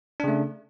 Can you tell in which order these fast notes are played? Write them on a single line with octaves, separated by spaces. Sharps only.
D4 C#3 A3